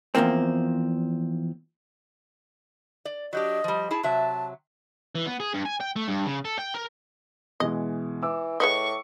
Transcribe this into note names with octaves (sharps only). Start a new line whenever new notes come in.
E2 G#2 F3 A#3 C4
D5
F#3 D4 G4 D#5
F3 G3
E4 G#4 A5
C3 F#3 E5 A5
E3
B3
G#4
G2
G#5
G5
A3
G2
C#3
A4
G5
A#4
B2 E3 G#3 D#5
E3 D6 E6
A2 G#4 B4 D#5 C#6